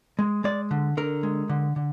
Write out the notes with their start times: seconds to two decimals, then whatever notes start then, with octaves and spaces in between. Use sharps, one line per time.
0.19 G#3
0.44 G#3 D5
0.71 D3
0.97 D3 A#4
1.23 G#3
1.49 D3
1.76 D3